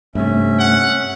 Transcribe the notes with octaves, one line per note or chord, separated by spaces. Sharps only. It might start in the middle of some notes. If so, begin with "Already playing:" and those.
G2 C3 A3 C#4 E5
F#5